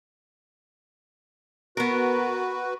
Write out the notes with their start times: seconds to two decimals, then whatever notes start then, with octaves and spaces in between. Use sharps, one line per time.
1.77 B3 F#4 A#4 B4